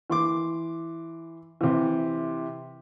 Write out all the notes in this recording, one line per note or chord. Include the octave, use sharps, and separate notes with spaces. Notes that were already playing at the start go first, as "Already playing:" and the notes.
E3 C6 D6
C3 E3